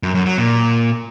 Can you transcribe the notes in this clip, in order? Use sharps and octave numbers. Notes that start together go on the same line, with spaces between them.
F#2
F#2
F#3
A#2